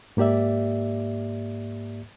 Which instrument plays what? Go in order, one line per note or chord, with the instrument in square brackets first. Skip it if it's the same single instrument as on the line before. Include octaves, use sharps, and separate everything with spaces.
[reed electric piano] G#2 A#3 G4 D5 E5